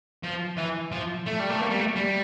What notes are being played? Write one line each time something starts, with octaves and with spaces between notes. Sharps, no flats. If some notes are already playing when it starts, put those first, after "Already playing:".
F3
E3
F3
A3
G3
A3
A#3
G3
A3
G3